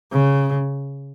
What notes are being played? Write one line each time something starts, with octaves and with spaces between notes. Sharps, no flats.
C#3